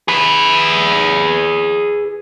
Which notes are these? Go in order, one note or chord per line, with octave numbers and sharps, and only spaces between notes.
G#4 B4